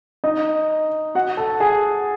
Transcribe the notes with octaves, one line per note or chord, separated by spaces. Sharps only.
D#4 D#5
F#4 F#5
A4 A5
G#4 G#5